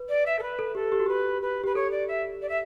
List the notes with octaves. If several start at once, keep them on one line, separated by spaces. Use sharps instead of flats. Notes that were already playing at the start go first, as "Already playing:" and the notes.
Already playing: B4
D5
E5
A4
B4
A4
G4 A4
G4
F#4
G4 B4
B4
G4 B4
A4 C#5
D5
E5
D5
E5